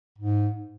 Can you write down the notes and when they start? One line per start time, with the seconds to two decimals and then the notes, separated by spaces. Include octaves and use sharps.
0.18 G#2